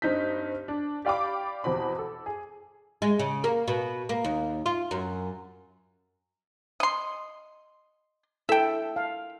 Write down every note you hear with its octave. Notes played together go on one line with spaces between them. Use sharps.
G2 C4 D#4 G6 B6
D4
G4 D5 F5 G5 B5 D6
E2 B2 C4 B5
A4
G#4
G#3
C#3
A#3
B2
A#3
D#2
F4
F#2
D#5 C6
E4 A4 E5 G5
F5 A5